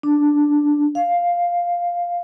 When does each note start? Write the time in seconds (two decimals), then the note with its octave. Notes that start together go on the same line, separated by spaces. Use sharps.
0.03 D4
0.95 F5